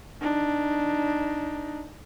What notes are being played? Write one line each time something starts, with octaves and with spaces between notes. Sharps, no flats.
D4 D#4